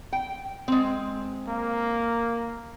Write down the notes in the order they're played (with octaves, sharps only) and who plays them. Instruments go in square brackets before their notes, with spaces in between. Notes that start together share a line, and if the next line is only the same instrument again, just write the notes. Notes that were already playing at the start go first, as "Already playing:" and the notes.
[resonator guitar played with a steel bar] G5
G#3 C4
[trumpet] A#3